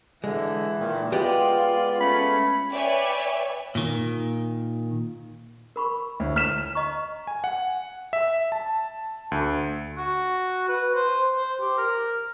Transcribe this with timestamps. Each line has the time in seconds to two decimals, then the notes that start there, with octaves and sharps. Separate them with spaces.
0.24 D3 E3 G#3
0.79 A#2 D#3
1.12 G#3 B3 F4 G4 D5
2.01 A3 C#4 B5
2.71 B4 C#5 D5 E5 G5 G#5
3.75 A#2 D#3
5.76 A#4 B5 C#6
6.20 D2 E4 C#5
6.36 F6 B6 E7
6.75 D#5 A#5 C#6
7.27 G#5
7.44 F#5
8.13 E5
8.52 A5
9.32 D2
9.97 F#4
10.68 B4
10.95 C5
11.36 C5
11.61 G4
11.77 A#4